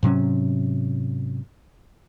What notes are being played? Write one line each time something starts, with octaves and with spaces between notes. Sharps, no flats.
G#2 C3 F#3 C#4